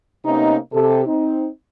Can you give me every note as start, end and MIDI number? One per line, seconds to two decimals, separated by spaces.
0.25 0.57 48
0.25 0.57 58
0.25 0.57 59
0.25 0.57 61
0.25 0.57 63
0.73 1.01 48
0.73 1.01 67
0.73 1.01 69
1.06 1.47 60
1.06 1.47 63